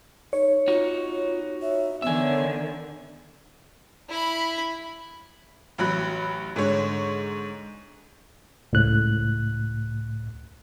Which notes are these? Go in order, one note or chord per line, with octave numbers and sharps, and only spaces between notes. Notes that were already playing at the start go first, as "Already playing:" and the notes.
D#4 C#5
D#4 F4 F#4
E5
D3 D#3 B3 E5 G#5
E4 B5
A1 F#3 B5 F#6
G#2 D3 C#5
C#2 A2 F#6